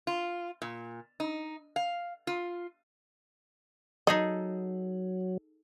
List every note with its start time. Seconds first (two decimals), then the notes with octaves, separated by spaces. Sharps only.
0.07 F4
0.62 A#2
1.20 D#4
1.76 F5
2.27 F4
4.07 F#3 D#4 G#4 A4 D#5